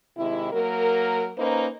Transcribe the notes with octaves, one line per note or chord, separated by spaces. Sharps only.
C3 D#3 G#3 E4
F#3 A#3 A#4
A#3 C#4 D#4 B4 C5